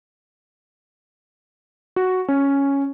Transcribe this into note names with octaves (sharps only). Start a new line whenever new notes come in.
F#4
C#4